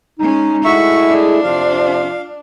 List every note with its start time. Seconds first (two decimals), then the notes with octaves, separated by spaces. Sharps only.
0.19 G#3 C#4 D#4
0.65 G#3 A3 E4 F#4 E5 C#6
1.09 D4 G#4
1.43 F2 C3 F3 F4 F5